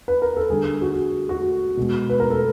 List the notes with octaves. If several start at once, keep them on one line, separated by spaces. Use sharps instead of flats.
B4
A#4
A4
D3 G3 G#4
F#4
F#4
B2 G#3
B4
A#4
A4